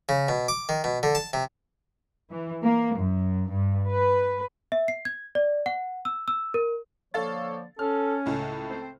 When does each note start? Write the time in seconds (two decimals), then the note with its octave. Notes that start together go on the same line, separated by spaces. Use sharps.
0.09 C#3
0.29 B2
0.48 D6
0.69 D#3
0.84 B2
1.03 D3
1.15 A5
1.33 C3
2.31 E3
2.63 A#3
2.97 F#2
3.51 G2
3.89 B4
4.72 E5
4.88 C7
5.05 G#6
5.35 D5
5.66 F#5
6.05 E6
6.28 E6
6.54 A#4
7.14 D3 F3 A#3 A4 C#5 F5 A6
7.79 C#4 A4 F6
8.26 C#2 A2 A4
8.70 C4 C5